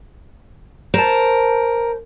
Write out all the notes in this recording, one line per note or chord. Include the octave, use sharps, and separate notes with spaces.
A#4 C5 A5